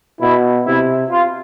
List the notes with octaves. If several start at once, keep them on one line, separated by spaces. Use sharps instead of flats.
B2 E4
C3 E4
F4